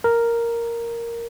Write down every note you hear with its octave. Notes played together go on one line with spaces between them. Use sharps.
A#4